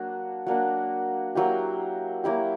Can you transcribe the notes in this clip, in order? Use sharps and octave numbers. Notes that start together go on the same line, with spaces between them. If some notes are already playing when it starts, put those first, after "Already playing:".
Already playing: F#3 A#3 D4 F#4
F#3 A#3 D4 F#4
F#3 A#3 E4 G4
F#3 A#3 E4 G4